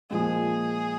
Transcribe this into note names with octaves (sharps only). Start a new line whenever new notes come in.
A#2 F3 G#3 G#4